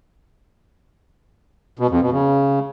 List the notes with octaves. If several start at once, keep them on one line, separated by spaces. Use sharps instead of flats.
B2
F2
B2
C#3